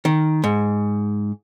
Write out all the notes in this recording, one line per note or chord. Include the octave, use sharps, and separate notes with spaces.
D#3
G#2